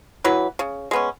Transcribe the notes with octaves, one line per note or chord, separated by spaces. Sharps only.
E3 F#3 E4 B4
C#3
G#3 B3 C#4